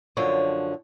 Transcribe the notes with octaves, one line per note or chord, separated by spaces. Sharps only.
F#2 D3 F3 C#5